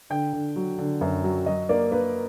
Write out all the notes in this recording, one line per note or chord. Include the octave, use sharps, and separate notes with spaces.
D3 G5
D3
F#3
D3
F#2
F#3
F#3 D#5
A#3 D5
A#3 B4